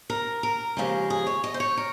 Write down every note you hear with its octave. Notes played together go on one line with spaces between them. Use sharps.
A#4
A#4
D#2 C#3 F3 G#3
G#4
C#5
D#5
C5
C#5
A#4